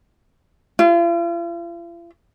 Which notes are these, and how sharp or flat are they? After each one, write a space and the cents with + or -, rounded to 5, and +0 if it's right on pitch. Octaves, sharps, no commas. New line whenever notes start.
F4 -45